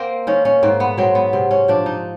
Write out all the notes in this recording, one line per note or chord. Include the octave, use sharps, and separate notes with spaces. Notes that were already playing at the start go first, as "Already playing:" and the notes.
Already playing: A#3 C4
D#3 C#4
C#4
G#2 C4
B3
F#3 C4
B3
C3 C4
C#4
F3 D4
D#4